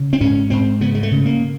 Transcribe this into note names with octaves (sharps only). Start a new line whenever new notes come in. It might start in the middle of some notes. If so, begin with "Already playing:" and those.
Already playing: C#3
C4
G#2 C#4
G#2 C4
C#3 B3
G#3
A3
C#3
A#3